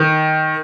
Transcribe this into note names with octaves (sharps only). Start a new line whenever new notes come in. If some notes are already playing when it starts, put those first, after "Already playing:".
Already playing: D#3